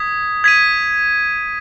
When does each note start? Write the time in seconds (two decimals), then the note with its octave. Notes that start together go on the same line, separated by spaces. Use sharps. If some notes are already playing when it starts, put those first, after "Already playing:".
Already playing: D#6 G#6 B6
0.44 G#6 B6 D#7